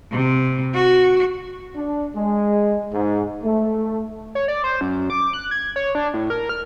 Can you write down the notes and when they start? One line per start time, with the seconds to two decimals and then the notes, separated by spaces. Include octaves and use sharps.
0.11 C3
0.74 F#4
1.76 D4
2.16 G#3
2.93 G#2
3.44 A3
4.35 C#5
4.48 D5
4.64 C5
4.81 F#2
5.10 D6
5.33 F#6
5.51 G#6
5.76 C#5
5.95 D4
6.14 A2
6.30 A#4
6.49 F6